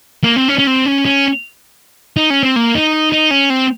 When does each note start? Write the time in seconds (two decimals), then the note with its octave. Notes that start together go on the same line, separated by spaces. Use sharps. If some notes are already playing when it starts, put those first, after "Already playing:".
0.24 A#3
0.36 C4
0.48 C#4
0.59 C#4
0.67 C4
0.86 C#4
1.05 C#4
2.17 D#4
2.30 C#4
2.43 C4
2.56 A#3
2.75 D#4
3.12 D#4
3.31 C#4
3.50 C4